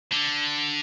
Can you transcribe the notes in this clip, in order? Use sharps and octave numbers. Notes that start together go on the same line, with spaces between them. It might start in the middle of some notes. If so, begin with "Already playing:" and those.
D3